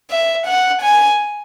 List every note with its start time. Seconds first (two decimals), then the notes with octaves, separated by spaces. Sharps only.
0.10 E5
0.46 F#5
0.82 G#5